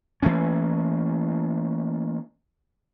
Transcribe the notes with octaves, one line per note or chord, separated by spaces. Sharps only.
E3 A3 A#3 C#4